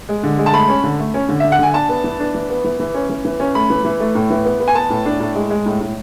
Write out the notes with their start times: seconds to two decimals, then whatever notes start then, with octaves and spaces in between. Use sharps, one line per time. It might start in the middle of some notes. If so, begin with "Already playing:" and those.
0.09 G#3
0.23 D3
0.38 G#3
0.46 A5
0.53 A3 B5
0.69 C#4
0.84 D3
0.99 A3
1.14 C#4
1.29 D3
1.40 D3 E5
1.52 F#5
1.59 D3 G#5
1.74 D4 A5
1.89 B3
2.04 E3
2.20 D4
2.35 E3
2.50 B3
2.64 E3
2.80 E3
2.95 C#4
3.10 E3
3.25 E3
3.40 C#4
3.55 A3 B5
3.70 E3
3.85 E3
4.00 A3
4.15 A2
4.30 E3
4.45 B3
4.60 B3
4.68 G#5
4.75 B3 A5
4.90 A2
5.06 D4
5.20 A2
5.35 G#3
5.50 G#3
5.66 A2
5.81 A2